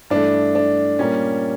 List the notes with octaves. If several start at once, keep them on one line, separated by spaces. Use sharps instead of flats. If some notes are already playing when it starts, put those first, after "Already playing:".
G2 E3 A3 D4
D4
A#2 G3 A#3 C#4